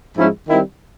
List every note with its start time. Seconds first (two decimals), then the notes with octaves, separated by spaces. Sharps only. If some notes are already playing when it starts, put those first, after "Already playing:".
0.17 G#2 F3 G#3 C#4 E4
0.49 D#3 G3 C4 E4